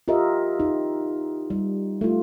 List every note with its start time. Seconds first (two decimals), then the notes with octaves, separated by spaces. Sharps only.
0.08 F4 G4 A#4 D#5 E5
0.60 D#4
1.50 G3
2.01 A3 F4